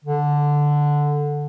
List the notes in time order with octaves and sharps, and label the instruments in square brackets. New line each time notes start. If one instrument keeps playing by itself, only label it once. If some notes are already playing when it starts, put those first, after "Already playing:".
[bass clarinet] D3